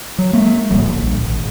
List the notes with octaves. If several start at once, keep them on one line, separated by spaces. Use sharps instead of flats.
F#3
G#3 A#3
D1 A#1 G3
A#1
G#1